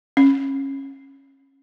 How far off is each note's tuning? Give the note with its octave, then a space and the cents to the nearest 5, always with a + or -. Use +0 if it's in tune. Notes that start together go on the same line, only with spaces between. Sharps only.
C#4 -20